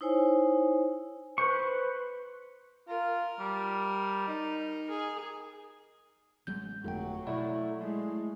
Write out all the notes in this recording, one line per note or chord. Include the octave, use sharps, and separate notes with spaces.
D#4 E4 C5 C#5 G#5
B4 C5 C#6
F4 A#4
G3
D#4
G#4
A1 F#3 G#3 G6
G1 F2 F#3 A3 G5
B2 A3 E4 D5
A2 G#3